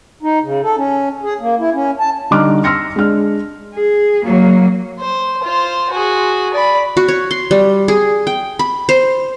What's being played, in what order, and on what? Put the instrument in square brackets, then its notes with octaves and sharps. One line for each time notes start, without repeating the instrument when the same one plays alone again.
[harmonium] D#4
C#3
A4
C#4
G#4
A#3
E4
C#4
A5
[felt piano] D3 G3 D#4 D6 F6 F#6
C6 E6 F6 A#6 C#7
G#3 D4 F6
[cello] G#4
F#3 A#3
[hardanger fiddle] C5
F4 C5
F#4 G#4
D5 B5
[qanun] F#4
C#5
C6
G3
G#4
G5
B5
C5